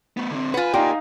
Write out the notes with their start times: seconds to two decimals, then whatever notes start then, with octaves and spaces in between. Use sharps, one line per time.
0.17 A3 B3
0.31 D3 C4
0.54 F4 B4 F#5 G#5
0.74 A#3 D#4 F4 G4 D5 F5 G5 A#5